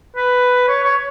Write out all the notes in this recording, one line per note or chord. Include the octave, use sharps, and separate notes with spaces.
B4
C#5
C#5